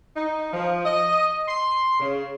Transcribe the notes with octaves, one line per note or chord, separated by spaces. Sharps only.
D#4
F3
D#5
C6
C#3